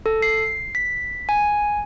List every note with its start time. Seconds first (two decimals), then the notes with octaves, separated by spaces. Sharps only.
0.06 A4
0.22 C7
0.75 B6
1.29 G#5